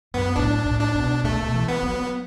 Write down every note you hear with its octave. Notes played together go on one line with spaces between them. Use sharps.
F#2 B3
A2 D4
A2
D4
B2
B2 A3
D3
B2
E3
B3
F#3